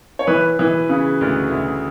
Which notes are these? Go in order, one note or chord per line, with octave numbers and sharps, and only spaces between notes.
C#5
E3 B4
E3
C#3
D2
D2